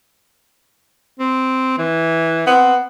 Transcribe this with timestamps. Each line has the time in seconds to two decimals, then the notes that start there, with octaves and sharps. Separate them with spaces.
1.19 C4
1.78 E3
2.47 B3 C4